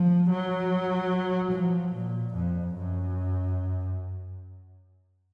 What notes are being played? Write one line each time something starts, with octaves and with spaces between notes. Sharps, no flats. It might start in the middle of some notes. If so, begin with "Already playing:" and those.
Already playing: F3
F#3
F3
A#2
F2
F#2